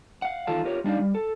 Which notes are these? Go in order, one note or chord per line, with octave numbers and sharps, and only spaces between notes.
F5 F#5
E2 D#3 F4 A4 F5 A5
F4 G4 A#4 B4 C#5
G3 D4 D#4 F5
G3
A4